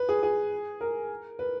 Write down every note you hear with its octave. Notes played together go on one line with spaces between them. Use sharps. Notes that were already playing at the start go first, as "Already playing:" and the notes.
Already playing: B4
G#4
G#4
A#4
B4